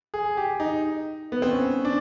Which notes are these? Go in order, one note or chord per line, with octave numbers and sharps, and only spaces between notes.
G#4
G4
D#4
B3
C4
C#4
D4